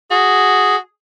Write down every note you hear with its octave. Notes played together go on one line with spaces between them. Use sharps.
F#4 G#4